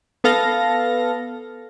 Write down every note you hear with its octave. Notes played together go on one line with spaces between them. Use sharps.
B3 A4 F5 A#6